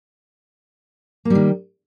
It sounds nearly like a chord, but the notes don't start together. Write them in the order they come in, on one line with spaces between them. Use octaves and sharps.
A#3 G3 D#3